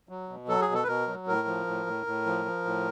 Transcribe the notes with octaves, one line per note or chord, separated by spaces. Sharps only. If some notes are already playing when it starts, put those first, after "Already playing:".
F#3
B2
F#3 A4
G#4
B2
A4
B4
B2 A#4
F#3
A2 A#4
F3
A2
A2
A2
F3
F3
A2